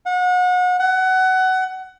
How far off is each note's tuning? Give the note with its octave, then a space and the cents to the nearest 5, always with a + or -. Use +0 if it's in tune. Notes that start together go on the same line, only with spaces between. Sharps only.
F#5 -35
F#5 +20